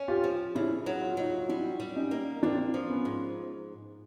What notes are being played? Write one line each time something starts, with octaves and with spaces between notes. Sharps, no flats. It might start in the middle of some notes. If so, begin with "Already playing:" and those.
Already playing: C#4
F4 G4
F3
C#3 D4 E4
F#3
F4
F#4
F#3 D#4 F4
F4
G3 D4 E4
G3
C#4 D#4
A#3
A#3 C4 D4
F3
B3 C#4
G#2